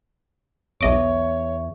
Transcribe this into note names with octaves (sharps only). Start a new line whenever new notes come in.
B1 E2 C#5 D#5 E5 C#6 D6